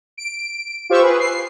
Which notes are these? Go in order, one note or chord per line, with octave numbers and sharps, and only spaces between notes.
D7
F4 G4 C5 C#6 E6
G#4 B4
C7